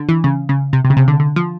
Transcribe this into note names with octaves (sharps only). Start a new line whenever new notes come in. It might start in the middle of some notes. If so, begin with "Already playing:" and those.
Already playing: D3
E3
C#3
C#3
C3
C3
C#3
C3
D3
D3
F3